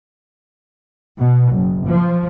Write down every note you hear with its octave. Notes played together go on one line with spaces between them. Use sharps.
B2
F#1
F3